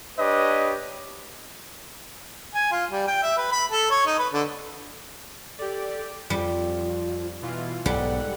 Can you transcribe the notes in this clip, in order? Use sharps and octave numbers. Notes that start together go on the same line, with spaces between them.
D4 G4 B4 C#5 D#5
G#5
F4
G3
G5
E5
B4
B5
A4
C#5
D#4
B4
D3
G4 A4 D5
F2 G3 F4
B2 E3 F4
B1 G#2 G3 A4 F#5